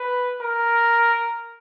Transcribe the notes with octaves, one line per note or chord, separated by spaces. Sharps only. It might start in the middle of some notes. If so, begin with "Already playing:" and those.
Already playing: B4
A#4